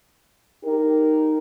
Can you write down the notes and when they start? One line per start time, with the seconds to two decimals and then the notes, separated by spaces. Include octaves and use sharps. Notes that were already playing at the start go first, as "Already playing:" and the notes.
0.64 D#4 G4 A#4